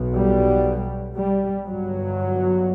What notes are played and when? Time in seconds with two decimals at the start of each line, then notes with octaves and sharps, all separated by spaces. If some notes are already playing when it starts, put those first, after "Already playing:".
Already playing: B1 B2
0.14 G3
1.15 G3
1.66 G1 G2 F#3